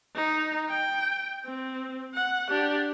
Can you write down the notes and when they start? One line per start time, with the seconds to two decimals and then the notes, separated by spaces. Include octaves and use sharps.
0.15 D#4
0.69 G5
1.45 C4
2.14 F#5
2.50 D4 G4